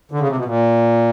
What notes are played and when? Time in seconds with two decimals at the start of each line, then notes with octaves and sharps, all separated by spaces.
0.11 D3
0.20 C#3
0.28 C3
0.36 B2
0.45 A#2